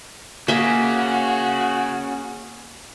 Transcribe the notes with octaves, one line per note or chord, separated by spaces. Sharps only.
A#3 C#4 F#4 G#4 E5